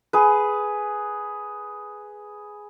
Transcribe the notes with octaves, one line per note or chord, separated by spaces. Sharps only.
G#4 B4